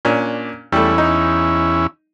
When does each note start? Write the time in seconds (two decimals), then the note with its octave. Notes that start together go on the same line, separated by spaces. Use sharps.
0.05 A#2 C#4 D4
0.72 E2 G3 A3 C#4 E4
0.98 D#4